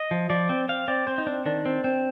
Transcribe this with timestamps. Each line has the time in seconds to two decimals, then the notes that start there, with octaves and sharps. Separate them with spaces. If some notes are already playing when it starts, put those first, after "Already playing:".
Already playing: D#5
0.11 F3
0.30 F3 D5
0.49 C4
0.69 C4 F5
0.88 C4 D5
1.07 C4 C5
1.18 D#4
1.27 C4 D4
1.46 D#3 D4
1.65 C4
1.84 C4